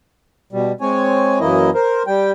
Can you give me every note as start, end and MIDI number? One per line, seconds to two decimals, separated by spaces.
0.53 0.72 47
0.53 0.72 55
0.81 1.39 56
0.81 1.39 60
0.81 1.39 73
0.81 1.39 80
1.40 1.70 42
1.40 1.70 52
1.40 1.70 58
1.40 1.70 64
1.40 1.70 75
1.74 2.03 70
1.74 2.03 72
2.07 2.32 55
2.07 2.32 79